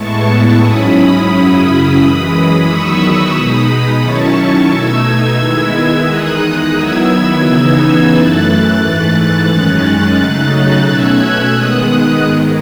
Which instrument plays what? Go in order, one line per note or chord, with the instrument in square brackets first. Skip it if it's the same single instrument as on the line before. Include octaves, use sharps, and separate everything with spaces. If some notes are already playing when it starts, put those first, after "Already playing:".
Already playing: [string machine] A2 G#3 B3 E4 A5 C#6
G#2 F#3 C#4 E4 B5 D#6
F#2 C#3 F#3 C#4 E4
F#2 E3 G#3
E2 D#3 F#3 C#6 E6
B2 G#3 D#4 B5 D#6
D#3 F#3 C#4 E4 A5 C#6
B2 A3 D#4 E6 G#6
D#3 G#3 B3 E4 E6 G#6
E2 D#3 G#3 D#4 D#6 F#6
D#3 F#3 B3 E4 E6 G#6
E6 G#6
C#3 E3 B3 D#4 E6 G#6
F#2 E3 A3 F#6 A6
G#2 E3 A3 F#6 A6
F#2 D#3 G#3 C#4
C#3 F#3 A3 D#4
B2 A3 C#4 E6 G#6
D#3 G#3 B3 D#6 F#6
G#2 D#3 G#3